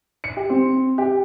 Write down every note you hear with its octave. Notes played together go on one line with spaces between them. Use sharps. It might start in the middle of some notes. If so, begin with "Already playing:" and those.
C#7
G4
C4
G4